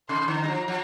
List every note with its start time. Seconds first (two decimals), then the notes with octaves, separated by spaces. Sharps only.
0.09 C3 C6
0.28 D3
0.38 A#5
0.44 G3
0.48 F3
0.68 F3